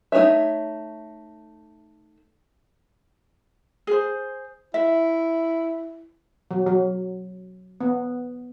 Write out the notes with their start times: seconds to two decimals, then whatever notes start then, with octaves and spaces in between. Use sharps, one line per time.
0.12 A3 D#4 B4 C#5 E5
3.87 G#4 C5
4.74 E4 E5
6.51 F#3
6.67 F#3
7.80 B3